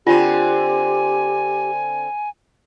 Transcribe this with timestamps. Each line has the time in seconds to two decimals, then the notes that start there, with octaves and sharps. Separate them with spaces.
0.07 D3 C4 F4 G4 G#5